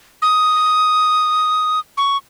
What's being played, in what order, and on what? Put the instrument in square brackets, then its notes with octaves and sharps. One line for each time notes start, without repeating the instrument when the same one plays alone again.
[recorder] D#6
C#6